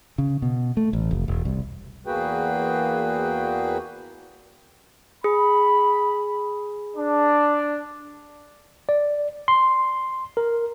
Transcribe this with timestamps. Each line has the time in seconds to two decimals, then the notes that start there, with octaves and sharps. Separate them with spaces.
0.18 C#3
0.42 B2
0.77 A3
0.93 A1
1.11 F1
1.28 E1
1.45 C2
2.07 E2 A#3 F#4 G#4 B4 G5
5.24 G#4 B5
6.95 D4
8.89 D5
9.48 C6
10.37 A#4